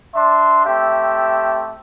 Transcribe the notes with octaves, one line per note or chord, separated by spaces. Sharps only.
D4 E5 C6
A3 C4 G4 E5